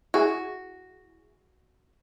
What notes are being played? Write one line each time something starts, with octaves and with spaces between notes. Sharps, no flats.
E4 F#4 G#4